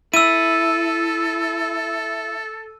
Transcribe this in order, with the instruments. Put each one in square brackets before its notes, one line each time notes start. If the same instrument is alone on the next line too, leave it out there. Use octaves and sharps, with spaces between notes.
[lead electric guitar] E4 [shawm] A4 [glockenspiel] E6 D#7